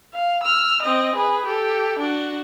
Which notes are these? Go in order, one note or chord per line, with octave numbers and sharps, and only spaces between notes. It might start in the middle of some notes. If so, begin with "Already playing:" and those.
F5
E6 F6
C4 D#5
G#4 B4
G4 A4
D4 F#4